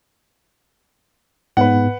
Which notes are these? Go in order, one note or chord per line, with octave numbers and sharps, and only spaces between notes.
G#2 B3 B4 F#5